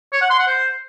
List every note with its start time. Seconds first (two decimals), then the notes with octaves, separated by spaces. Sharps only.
0.13 C#5
0.21 F#5
0.30 C6
0.39 F#5
0.47 C5